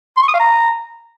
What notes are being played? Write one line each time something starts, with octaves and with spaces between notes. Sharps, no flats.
C6
C#6
D#6
F5
A#5